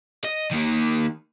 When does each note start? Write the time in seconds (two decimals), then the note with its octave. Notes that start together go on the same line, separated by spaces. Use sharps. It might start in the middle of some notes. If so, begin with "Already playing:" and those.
0.24 D#5
0.51 D#3 A#3